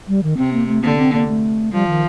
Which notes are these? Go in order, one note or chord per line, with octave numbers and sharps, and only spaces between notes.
G3
D#3
C3 C4
A#3
A3
D3 A#3
C4
A#3
A3
F3 G3
D#3